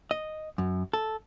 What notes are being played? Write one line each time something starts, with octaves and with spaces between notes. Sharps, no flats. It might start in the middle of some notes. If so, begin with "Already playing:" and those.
D#5
F#2
A4